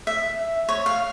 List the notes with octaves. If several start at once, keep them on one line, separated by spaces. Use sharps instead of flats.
E5
C#5
F5